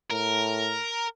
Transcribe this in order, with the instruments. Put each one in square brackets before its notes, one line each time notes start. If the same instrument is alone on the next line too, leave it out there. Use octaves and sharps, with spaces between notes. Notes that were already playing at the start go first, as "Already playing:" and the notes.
[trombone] A2 [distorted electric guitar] A#4